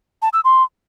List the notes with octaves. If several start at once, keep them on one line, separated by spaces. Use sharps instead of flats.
A5
E6
C6